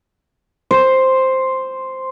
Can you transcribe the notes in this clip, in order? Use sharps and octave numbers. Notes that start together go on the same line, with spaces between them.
C5